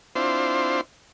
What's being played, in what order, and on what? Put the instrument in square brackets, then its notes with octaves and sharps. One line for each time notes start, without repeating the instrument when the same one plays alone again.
[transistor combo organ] C4 D4 E4 F4 C5